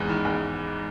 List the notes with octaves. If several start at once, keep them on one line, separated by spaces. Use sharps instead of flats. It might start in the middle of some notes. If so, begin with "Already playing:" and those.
Already playing: E2 G#2 B4
D#3
E2